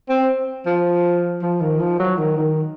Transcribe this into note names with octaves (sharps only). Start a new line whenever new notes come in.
C4
F3
F3
D#3
F3
F#3
D#3
D#3